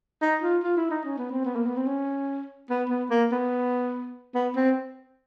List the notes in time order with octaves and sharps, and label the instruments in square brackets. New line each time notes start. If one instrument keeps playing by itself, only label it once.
[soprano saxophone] D#4
F4
F4
E4
D#4
C#4
B3
C4
B3
A#3
B3
C4
C#4
B3
B3
A#3
B3
B3
C4